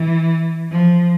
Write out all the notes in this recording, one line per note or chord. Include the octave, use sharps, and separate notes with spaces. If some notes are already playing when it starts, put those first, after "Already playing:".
Already playing: E3
F3